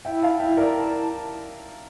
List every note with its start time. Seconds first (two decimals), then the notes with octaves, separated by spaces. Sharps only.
0.05 E4 E5 G5
0.22 F5 A5
0.40 E4 E5 G5
0.57 A#4 D5
0.74 A5